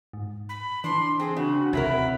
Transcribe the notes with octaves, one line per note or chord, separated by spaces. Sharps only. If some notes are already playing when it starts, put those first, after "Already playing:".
G#2
B5
E3 D4 C6
C4 G#4
C#3 D4 F#4
D2 C3 F#3 E4 A#4 B5